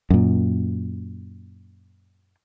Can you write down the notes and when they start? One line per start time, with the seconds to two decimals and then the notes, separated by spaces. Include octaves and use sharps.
0.10 F#2 A#2